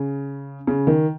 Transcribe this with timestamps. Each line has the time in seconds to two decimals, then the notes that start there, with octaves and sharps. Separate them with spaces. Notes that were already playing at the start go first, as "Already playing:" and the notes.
Already playing: C#3
0.67 C#3
0.87 D#3